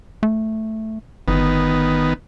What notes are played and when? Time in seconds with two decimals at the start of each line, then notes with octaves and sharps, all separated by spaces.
0.23 A3
1.28 G1 D#3 B3